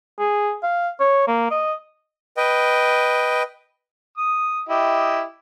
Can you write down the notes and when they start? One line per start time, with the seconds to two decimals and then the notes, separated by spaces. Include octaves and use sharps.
0.19 G#4
0.63 F5
1.00 C#5
1.28 A#3
1.51 D#5
2.37 B4 D#5 G5
4.18 D#6
4.69 E4 G4 D#5